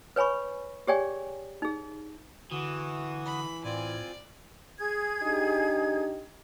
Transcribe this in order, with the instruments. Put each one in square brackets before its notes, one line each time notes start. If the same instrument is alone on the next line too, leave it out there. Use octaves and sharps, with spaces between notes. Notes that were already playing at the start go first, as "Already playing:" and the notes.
[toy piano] B4 C#5 G#5 B5 C#6
G4 G#4 C#5 D5 G5 G#5
D#4 G#4
[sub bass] D3 [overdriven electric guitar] E3 [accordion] F#4 D#6
[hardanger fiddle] B5
[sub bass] A2 [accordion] C4 F4 G#5 [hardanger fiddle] D5
[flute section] G#4 G#6
[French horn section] D4 D#4 G4